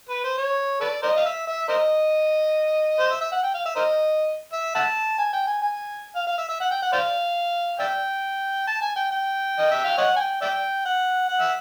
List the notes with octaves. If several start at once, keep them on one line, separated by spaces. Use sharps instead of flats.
B4
C5
C#5
A4 B4 D5
A#4 C5 D#5
F5
E5
E5
A#4 C5 D#5
C5
E5
E5
F#5
G5
F5
E5
A#4 C5 D#5
E5
E5 F#5 A5
G#5
G5
G#5
G#5
F5
F5
E5
E5
F#5
G5
F#5
C5 D5 F5
D5 E5 G5
A5
G#5
G5
G5
D#5
E5
F5
C#5 D#5 F#5
G#5
G5
D5 E5 G5
F#5
F#5
E5